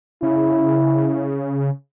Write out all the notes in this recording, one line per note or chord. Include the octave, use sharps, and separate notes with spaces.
C#3 E4